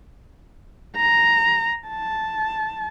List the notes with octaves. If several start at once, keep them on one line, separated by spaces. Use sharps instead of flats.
A#5
A5